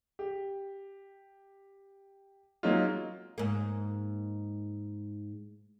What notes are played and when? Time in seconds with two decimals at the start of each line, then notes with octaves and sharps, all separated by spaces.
0.19 G4
2.63 F#3 G#3 A#3 C#4 D#4 F4
3.38 G#2 A#3